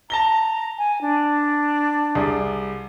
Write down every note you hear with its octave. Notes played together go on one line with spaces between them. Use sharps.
A5 A#5 A#6 G7
G#5
D4
C2 G#4 D5